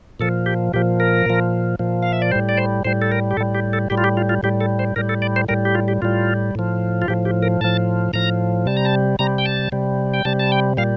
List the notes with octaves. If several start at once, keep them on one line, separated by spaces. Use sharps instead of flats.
A#2 F3 A4
G4
A#2 F3 G4
A#4
A#2 F3
A#2 F3
F5
E5
D5
A2 G3 C5
D5
C5
A2 G3 C5
A4
A#4
G4
A2 G3 A4
G4
A4
A2 G3 G4
F4
G4
F4
F4
A2 G3 G4
A4
C5
A2 G3 A#4
A4
D5
C5
A2 G3 A#4
G4
F4
G4
A2 G3 F4
A2 F3
F4
A2 F3 G4
G4
A#4
A2 F3 A5
A2 F3 A#5
C3 G3 A5
A#5
A5
C3 G3 A#5
G5
A5
C3 G3
G5
C3 G3 A5
A5
G5
A#2 G3 F5